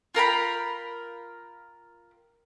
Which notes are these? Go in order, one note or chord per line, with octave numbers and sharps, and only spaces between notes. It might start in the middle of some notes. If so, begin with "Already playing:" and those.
F4 A#4 G5 B5